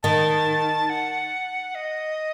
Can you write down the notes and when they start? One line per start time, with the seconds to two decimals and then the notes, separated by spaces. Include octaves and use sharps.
0.03 D#3 A5
0.89 F#5
1.75 D#5